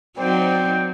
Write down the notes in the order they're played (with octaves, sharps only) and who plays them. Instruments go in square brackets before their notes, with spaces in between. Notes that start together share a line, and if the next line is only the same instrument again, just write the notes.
[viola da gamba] F#3 C4 D#4 [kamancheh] C5 D5 [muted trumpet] G5